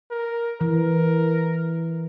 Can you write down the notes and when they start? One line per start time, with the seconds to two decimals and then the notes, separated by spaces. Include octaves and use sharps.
0.11 A#4
0.61 E3 A#4